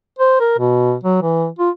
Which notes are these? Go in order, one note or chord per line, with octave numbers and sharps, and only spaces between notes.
C5
A#4
B2
F#3
E3
F4